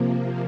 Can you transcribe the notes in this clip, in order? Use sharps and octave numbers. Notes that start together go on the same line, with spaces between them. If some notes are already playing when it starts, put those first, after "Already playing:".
Already playing: C3 F3 A#3